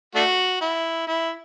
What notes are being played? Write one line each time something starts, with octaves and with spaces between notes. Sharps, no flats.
A3 D4 F#4
E4
E4